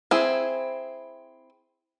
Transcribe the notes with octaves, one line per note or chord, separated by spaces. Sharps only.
C4 E4 G#4